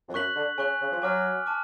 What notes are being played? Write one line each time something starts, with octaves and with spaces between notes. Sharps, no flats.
F2
F#2 C#6 F#6 B6 F#7
D3
C#3 G#5 C#6 F#6
C#3
F3
F#3 G#5 D6 F6
A5 D6 F6